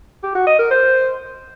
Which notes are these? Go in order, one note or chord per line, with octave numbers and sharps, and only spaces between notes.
G4
F#4
D#5
A#4
C5